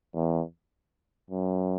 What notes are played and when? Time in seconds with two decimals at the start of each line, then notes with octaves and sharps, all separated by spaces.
0.14 E2
1.30 F#2